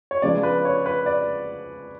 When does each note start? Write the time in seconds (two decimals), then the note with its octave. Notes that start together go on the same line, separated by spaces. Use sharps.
0.11 C#5
0.22 C#3 F3 G#3 B3 D4 D5
0.43 B4
0.65 C#5
0.86 B4
1.06 D5